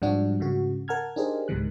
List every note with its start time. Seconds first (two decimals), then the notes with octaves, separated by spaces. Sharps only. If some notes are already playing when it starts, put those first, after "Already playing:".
0.02 G#2 F3 G3 D4 F#4
0.40 G#2 C#3 F#4
0.88 A#4 F#5 A5 F6 G#6
1.16 D4 D#4 G4 G#4 A#4 C5
1.48 C#2 G#2 C3 D#3 F#6